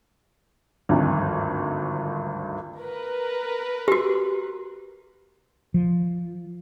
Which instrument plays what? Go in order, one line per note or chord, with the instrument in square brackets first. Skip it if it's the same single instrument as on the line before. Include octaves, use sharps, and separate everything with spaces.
[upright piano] G#1 D2 G2 F3
[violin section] A#4 B4
[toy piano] F#4 G4
[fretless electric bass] F3